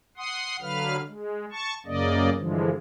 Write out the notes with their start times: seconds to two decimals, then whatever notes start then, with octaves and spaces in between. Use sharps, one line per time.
0.17 F#5 C6 D#6
0.62 D3 F#3 B4 F5 F6
1.08 G#3
1.52 A5 C#6
1.86 F#2 C#3 A#3 D5 D#5
2.37 G2 D3 E3 F3 G#3